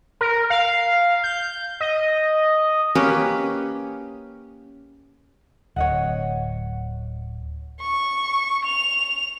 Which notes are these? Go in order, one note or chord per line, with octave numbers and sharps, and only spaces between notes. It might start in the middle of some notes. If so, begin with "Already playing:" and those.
A#4
F5
G6
D#5
A#3 C#4 G4 B4
D1 C#5 D#5 F#5
C#6
F7